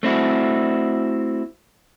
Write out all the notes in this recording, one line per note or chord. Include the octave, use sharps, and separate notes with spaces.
A3 C4 E4 F#4